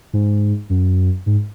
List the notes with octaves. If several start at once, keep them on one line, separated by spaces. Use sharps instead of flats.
G#2
F#2
G#2